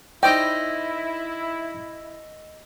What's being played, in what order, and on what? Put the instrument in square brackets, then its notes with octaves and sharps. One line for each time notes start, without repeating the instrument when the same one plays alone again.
[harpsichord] D#4 C5 D5 [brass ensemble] E4 [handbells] D#5 E6 A#6 [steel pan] G5